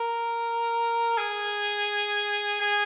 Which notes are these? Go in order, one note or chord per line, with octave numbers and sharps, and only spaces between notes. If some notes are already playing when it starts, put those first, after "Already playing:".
Already playing: A#4
G#4
G#4